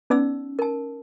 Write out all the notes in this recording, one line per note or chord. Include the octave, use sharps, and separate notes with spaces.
B3 C#4 D#4 D5 E6
A#4 A5